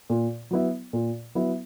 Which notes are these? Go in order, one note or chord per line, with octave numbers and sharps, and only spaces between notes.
A#2
F#3 B3 E4
A#2
F#3 B3 E4